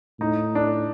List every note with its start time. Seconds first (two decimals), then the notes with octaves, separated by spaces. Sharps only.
0.20 A2 D#4
0.55 D4